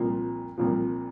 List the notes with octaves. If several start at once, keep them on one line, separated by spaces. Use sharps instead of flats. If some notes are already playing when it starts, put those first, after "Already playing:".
Already playing: C2 A#2 F3
C2 A#2 F3